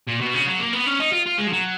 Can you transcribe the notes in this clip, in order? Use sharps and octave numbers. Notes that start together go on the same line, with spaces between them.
A#2
B2
C#3
F#3
A#3
B3
C#4
D#4
F4
F4
G#3
F3
F#3